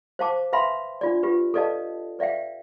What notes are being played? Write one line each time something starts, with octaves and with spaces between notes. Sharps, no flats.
C5 F5 A5 D6
B4 E5 F5 G#5 B5 C6
D4 F4 D5
F4 G4 B4
A4 B4 D5 D#5 F5 A5
B4 D5 E5 F5 G5